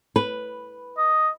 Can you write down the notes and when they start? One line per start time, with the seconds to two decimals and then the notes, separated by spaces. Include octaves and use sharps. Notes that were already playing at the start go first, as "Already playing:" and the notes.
0.16 B4
0.98 D#5